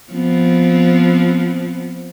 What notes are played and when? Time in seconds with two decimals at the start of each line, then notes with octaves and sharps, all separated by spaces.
0.13 F3 B3 C4